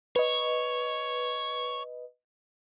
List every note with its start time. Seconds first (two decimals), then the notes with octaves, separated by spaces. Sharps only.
0.16 B4 C#5 D#5